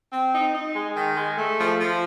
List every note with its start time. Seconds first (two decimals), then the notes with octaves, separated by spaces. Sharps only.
0.13 C4
0.34 D#4
0.55 D#4
0.75 G#3
0.96 D#3
1.16 G#3
1.37 A3
1.58 F3
1.78 F3